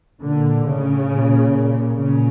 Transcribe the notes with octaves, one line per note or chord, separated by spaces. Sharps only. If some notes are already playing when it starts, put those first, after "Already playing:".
A#2 D3
A2 C#3
A#2
A#2
A#2 C#3